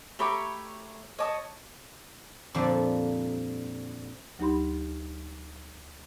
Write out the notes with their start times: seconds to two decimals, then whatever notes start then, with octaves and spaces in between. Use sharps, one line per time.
0.19 A3 G4 C#5 A#5 B5 D6
1.19 C#5 D#5 A5 D6 D#6
2.54 F2 A#2 D3 F3 G3
4.39 D2 F#3 D#4 G4 B5 C6